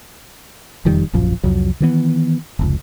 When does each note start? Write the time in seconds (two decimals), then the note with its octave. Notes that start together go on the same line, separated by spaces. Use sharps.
0.85 E1 F2 D#3 G3
1.13 D1 A#1 F#2 F3
1.43 C2 F2 F#3
1.80 D#3 E3 B3
2.59 F1 C#2